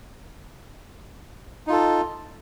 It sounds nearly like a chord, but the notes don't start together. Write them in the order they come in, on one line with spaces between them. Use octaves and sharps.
D#4 F4 A4